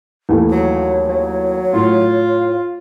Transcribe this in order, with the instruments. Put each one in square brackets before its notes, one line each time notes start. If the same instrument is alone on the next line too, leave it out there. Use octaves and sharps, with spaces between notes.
[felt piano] D#2 E3 A3
[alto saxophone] F#3 [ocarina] C#5
[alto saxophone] F#3
[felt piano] A2 [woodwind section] F4